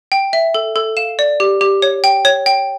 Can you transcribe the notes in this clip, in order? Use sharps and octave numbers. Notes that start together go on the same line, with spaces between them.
G5
E5
A4
A4
F5 E7
D5
G4
G4
C#5
G5
C#5
G5